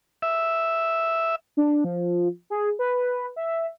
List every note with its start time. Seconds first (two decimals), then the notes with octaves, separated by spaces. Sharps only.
0.22 E5
1.57 D4
1.84 F3
2.50 G#4
2.79 B4
3.36 E5